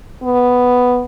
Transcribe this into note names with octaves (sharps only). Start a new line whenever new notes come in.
B3